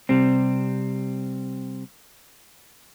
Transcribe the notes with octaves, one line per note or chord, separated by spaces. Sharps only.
C3 G3 C4